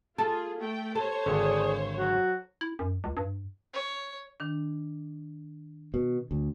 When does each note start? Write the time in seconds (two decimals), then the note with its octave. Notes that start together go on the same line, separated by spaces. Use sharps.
0.18 F4 G#4 A4
0.58 A3 G5
0.95 A4 C5 C#5
1.26 G#1 D3 D4 G#4
1.97 F#3 F#4
2.61 E4
2.79 F#2
3.04 C#2
3.17 G2
3.73 C#5
4.40 D#3 D4
5.94 B2
6.31 D2